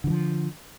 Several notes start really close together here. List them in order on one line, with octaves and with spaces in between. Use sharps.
D3 E3 F3